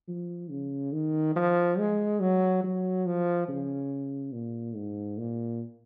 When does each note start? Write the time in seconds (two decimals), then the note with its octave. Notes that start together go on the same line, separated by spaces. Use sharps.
0.08 F3
0.50 C#3
0.93 D#3
1.36 F3
1.78 G#3
2.20 F#3
2.64 F#3
3.06 F3
3.48 C#3
4.33 A#2
4.76 G#2
5.18 A#2